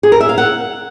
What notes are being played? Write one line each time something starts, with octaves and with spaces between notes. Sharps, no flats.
G#4
A#4
E5
F5
F#5